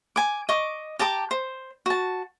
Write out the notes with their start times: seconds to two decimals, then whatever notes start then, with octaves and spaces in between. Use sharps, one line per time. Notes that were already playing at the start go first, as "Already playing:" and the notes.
0.16 G#5 D6
0.49 D#5 C#6 D6
0.99 G4 A5 A#5 D6
1.31 C5
1.86 F#4 A5